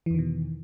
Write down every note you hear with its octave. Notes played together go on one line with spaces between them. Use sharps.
E2 B2 D#3 E3